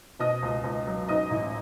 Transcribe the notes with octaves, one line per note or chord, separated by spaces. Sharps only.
B2 D#5 D#6
C#2
C#2
F#3
G#2 D#5 D#6
A1